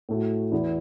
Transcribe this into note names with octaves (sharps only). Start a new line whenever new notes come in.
A2 A3 F#4
E2 E3 B3 E4